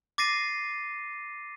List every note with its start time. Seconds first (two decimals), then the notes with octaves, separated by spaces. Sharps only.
0.18 D6 A6 A#6 C7 D#7